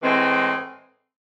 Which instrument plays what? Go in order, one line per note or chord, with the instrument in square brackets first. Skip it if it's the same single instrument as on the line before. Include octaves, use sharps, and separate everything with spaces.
[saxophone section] A2 E3 G#3 C4